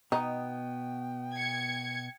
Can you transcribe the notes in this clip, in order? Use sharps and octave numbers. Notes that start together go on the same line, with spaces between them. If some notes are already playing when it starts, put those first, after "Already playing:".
B2 B3 D#4 G5
G#6 C#7